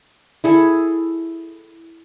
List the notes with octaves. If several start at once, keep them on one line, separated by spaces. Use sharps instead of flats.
E4 G#4 A4